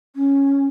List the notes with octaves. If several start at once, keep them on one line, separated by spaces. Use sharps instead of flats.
C#4